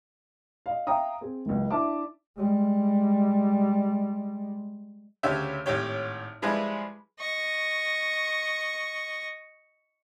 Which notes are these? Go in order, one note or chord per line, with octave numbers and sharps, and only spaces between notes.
D#5 F5
E5 F5 G5 A#5 D#6
C4 G#4
F#1 C#2
D4 E4 E5 A5 D6
G3 G#3
D2 C#3 G4 C#5 E5
G#1 A2 G4 C#5
F3 G3 G#3 E4 G#4 B4
D#5 C#6